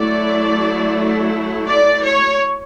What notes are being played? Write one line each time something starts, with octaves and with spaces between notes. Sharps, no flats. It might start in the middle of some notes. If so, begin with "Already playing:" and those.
Already playing: F#3 A3 E4 D5
D5
C#5